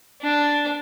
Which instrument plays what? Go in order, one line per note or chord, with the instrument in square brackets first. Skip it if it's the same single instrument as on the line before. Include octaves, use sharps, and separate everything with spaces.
[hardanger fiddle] D4